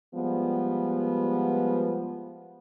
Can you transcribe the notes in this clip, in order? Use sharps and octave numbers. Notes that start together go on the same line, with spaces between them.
F3 G3 G#3 B3